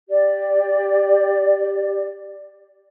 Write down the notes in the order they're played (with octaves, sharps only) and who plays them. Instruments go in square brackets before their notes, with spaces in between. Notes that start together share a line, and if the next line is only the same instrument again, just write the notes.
[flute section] G4 D5